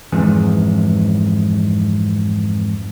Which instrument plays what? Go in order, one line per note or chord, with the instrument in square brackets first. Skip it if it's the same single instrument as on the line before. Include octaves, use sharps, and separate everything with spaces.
[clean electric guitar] F2 G#2 E3 G#4